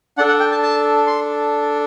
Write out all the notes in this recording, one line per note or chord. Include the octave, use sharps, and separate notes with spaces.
D4 A4 F#5
F#5
G5
A5
A5
C6